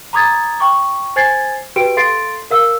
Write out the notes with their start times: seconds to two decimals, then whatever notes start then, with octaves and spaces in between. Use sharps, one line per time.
0.13 A#5 B5 D6 D#6 G#6 A6
0.60 G5 C#6 D6
1.16 C5 G#5 G#6 A6 C7
1.76 F#4 G4 B4 G5 D7
1.97 A4 F5 C6 A6 C7 D7
2.51 A#4 F5 E6